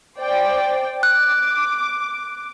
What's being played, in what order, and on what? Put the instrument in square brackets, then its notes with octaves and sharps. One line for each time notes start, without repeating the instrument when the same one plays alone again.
[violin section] C5 D5 G5
[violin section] D6 [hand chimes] F#6